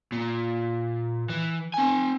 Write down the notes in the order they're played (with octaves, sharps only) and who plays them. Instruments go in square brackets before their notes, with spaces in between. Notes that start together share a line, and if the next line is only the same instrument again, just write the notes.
[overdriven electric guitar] A#2
E3
C4 G#5